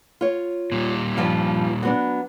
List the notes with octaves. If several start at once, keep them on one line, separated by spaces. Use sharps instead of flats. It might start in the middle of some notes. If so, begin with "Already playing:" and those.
F4 C#5
A#2 G3
G2 F3 F4
F#3 B3 D4